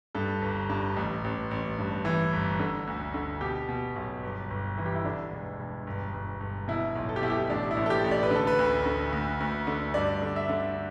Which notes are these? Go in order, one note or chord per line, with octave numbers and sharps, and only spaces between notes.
G2 A4
G1
G2
A1
A1
A1
G2
E3
G1
D3
D2
D3
B2 G4
B2
B1
G1
G1
E3
G4
E4
D3 D4
E1
E1
G1
G1
G1
B2 E4
B1
A4
G4
B2 E4
G4
A1 D4
E4
A1
A4
G4
A1
D5
B4
D3 A4
B4
D2
D3
D2
D2
D3
G2 D5
D3
E5
D3